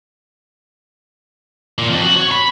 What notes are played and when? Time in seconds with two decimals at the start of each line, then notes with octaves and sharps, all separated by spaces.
1.78 A#2
1.90 F2
2.02 F#4
2.17 C#5
2.32 B5